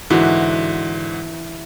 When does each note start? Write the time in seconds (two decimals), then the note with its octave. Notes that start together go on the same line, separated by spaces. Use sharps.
0.10 G#2 D3 E3 E4 F#4